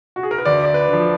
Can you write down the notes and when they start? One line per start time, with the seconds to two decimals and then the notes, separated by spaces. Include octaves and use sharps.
0.16 F#4
0.23 G#4
0.31 A#4
0.38 B4
0.45 D2 D5
0.65 D5
0.74 B4
0.88 D3 F3